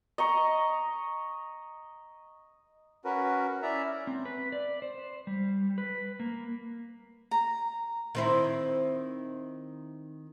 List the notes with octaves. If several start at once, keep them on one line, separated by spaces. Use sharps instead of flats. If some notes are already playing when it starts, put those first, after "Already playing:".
D#5 A#5 C#6
C#4 F#4 A#4 B4
C#4 E4 D5 E5 A#5
C4
B4
D5
C5
G3
B4
A#3
A#5
D#3 C4 E4